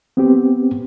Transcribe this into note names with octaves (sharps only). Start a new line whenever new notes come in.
B3 C4 G4